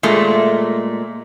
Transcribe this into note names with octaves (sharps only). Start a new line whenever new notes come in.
A#2 G#3 A3